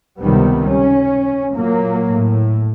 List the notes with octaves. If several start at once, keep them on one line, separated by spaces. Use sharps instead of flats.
C#2 C3 D#3 G3 B3
C#4
A#2 F#3 A#3
A2